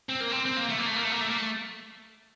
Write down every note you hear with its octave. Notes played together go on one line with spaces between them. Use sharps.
C4
A#3
C4
C4
A#3
A3
A#3
A3
A#3
A3
A#3
A3
A#3
A3